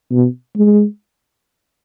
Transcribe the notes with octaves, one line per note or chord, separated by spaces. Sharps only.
B2
G#3